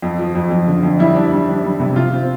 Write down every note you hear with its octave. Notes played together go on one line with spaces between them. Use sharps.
F2
F3
F2
F2
D3
F2
G3 E4
D4
G3
D4
G3
C3
C3 F4
C4